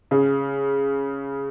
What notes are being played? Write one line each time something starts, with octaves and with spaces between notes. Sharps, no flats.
C#3